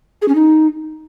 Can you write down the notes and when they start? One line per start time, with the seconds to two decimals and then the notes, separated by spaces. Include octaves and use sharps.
0.22 G#4
0.28 C#4
0.35 D#4